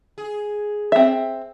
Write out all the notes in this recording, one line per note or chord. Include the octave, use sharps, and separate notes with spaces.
G#4
C4 E5